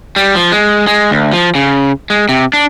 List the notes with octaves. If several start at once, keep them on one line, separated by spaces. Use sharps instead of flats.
G3
F3
G#3
G#3
D2
F3
C#3
G#3
C3
D4